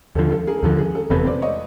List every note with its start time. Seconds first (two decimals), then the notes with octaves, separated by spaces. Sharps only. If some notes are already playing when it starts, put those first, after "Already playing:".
0.15 D#2 D3 F3 A4
0.32 A4
0.47 G#4 A#4
0.58 A#4
0.63 D#2 D3 F3 A4
0.78 G#4
0.95 A4
1.10 F1 E2 C3 A4 B4
1.26 C5 D5
1.42 C#5 D#5